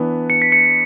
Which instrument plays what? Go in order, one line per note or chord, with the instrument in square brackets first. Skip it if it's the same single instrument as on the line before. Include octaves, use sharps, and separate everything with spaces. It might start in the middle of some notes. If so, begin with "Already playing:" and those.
Already playing: [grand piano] E3 B3 D4
[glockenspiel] C#7
B6
C#7